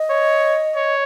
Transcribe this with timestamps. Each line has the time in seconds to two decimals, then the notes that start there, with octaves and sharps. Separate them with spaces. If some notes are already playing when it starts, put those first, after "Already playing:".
Already playing: D#5
0.10 C#5
0.75 C#5